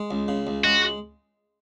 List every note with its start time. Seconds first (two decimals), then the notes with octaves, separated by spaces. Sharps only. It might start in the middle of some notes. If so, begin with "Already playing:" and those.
Already playing: G#3
0.11 C#2
0.28 C#3
0.47 C#2
0.64 G#3 F#4